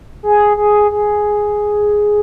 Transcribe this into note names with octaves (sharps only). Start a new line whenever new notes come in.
G#4
G#4
G#4